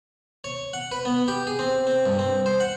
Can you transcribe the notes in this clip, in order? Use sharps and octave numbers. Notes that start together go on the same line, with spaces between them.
C#5
F#5
B4
B3
G4
G#4
C4
C4
G2
C4
C5
F#5